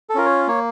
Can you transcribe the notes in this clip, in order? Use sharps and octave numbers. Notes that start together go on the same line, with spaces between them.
A4
C#4 F4 A#4
C#5
A#3 C#5